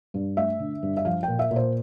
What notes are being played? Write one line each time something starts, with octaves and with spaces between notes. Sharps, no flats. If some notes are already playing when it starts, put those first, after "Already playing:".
G2
A3 E5
D3
G2
E5
F3 F5
G5
A#2
E5
A#2
C5